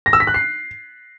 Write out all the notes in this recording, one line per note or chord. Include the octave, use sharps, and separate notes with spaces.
A#6
E6
B6
F#6
C7